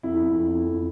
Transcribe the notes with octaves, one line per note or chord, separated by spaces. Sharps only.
F2 E4
F2
F2
F2